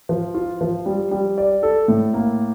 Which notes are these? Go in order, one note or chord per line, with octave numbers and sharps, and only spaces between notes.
F3
F4
F3
G3
G3
D5
A4
A2
A#3